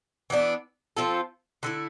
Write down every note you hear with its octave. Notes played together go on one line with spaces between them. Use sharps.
E3 B3 D4
F3 C4 F4 A4
D3 A3 E4